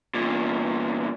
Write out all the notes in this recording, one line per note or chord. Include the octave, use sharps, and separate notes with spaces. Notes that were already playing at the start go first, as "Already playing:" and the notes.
E2 A#2